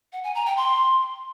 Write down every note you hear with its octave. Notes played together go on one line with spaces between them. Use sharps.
F#5
G#5
A#5
G5
C6